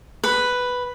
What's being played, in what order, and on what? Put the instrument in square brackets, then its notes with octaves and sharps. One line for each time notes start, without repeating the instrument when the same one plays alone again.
[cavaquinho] B4